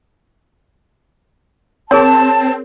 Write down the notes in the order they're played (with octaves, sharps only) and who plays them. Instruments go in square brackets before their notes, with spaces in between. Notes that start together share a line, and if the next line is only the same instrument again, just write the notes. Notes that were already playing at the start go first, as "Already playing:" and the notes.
[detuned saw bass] C4 [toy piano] G#4 A#4 C#5 [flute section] A5